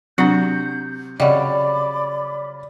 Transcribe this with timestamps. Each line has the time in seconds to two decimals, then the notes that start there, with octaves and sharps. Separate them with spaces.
0.18 C3 F#3 D4 F#4 F#5 G6
1.20 C#3 F#3 G3 D5 D#5 B5 D6